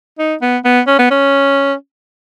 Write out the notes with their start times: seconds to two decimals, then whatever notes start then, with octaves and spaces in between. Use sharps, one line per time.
0.19 D#4
0.42 B3
0.65 B3
0.87 C#4
0.99 B3
1.11 C#4